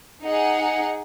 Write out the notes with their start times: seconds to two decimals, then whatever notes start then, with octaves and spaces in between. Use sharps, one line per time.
0.22 D#4 G#4 F#5 C#7